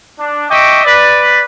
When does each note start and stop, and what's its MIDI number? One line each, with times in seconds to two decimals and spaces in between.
0.19 0.45 62
0.49 0.84 75
0.49 0.84 76
0.49 0.84 79
0.49 0.84 85
0.49 0.84 86
0.85 1.41 71
0.85 1.41 74